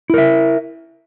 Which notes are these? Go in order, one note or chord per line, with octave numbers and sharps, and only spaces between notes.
E4 A#4 E5